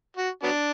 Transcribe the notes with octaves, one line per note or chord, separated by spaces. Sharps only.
F#4
F#3 B3 D4